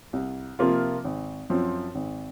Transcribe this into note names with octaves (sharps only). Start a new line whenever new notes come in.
C2
C3 F3 A#3 F4
G#1
F#2 F3 C4
G#1